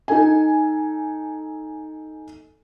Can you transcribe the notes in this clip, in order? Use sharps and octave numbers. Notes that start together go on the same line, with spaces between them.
D#4 A4 G#5